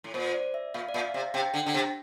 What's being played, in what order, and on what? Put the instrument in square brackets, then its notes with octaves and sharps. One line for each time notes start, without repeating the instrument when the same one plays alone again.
[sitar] A2
[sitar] A#2 [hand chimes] C5
[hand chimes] D5
E5
[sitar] A#2 [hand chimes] F5
[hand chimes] D5
[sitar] A#2 [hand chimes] E5
[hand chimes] F5
[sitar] C3
[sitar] C3 [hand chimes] G5
[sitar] D3
D3
C3